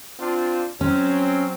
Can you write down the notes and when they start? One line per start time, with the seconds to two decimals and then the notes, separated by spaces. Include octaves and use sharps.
0.19 C4 D4 F4
0.81 F#3 C4 C#4